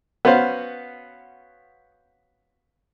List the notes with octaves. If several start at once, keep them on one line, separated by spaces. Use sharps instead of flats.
B3 C#4 F#4 B4 C5 F5